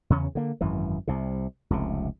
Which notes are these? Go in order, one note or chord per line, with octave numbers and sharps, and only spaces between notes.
E2 C#3 C#4
D3 A#3
G#1 F#2 E3
C2 C3
F1 C#2 C3